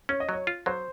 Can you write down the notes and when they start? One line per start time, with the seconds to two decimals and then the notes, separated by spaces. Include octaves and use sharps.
0.09 C#4 C#5
0.20 D#5
0.29 F#3 C#5
0.47 F4
0.66 F#3 C5